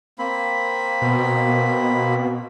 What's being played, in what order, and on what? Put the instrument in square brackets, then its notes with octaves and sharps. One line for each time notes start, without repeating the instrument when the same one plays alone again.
[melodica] A#3 C4 B5
[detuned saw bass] B2